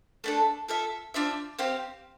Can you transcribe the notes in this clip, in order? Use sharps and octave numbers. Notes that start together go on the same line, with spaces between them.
A3 D4 A4
F4 A4 E5
D4 F4 C5 E5
C4 G4 C5 F5